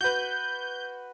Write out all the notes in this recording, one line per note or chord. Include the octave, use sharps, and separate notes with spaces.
F#4 B4 G6